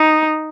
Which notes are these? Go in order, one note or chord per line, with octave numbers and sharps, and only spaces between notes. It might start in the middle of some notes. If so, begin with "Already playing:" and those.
Already playing: D#4